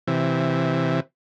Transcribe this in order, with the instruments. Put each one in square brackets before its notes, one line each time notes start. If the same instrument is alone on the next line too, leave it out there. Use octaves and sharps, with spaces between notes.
[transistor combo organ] C3 E3